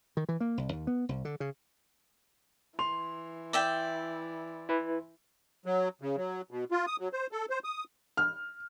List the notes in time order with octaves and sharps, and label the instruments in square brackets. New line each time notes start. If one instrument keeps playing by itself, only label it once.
[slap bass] D#3
E3
A#3
C2
D#2
B3
C2
D3
C#3
[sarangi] E3 [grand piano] C6 F7
[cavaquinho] D5 E5 G5
[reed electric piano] E4 B4
[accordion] F#3
C#3
F#3
B2
F4
D#6
F#3
C5
A4
C5
D#6
[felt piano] F6